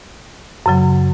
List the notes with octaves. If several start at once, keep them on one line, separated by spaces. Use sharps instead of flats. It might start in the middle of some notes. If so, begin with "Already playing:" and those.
F#2 C#3 F#3